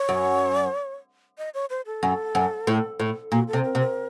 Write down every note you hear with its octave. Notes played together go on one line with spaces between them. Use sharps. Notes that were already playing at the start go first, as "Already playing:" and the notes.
Already playing: C#5
F#2
D#5
C#5
C5
A4
F#2
F#2
A2
A2
A#2 F#4
A4
C3
A#4
C3
A#4